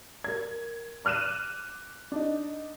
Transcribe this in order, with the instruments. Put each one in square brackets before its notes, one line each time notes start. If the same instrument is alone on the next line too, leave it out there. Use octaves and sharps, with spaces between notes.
[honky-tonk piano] A#4 G#6
D6 F6 F#6 D#7 E7
D4 D#4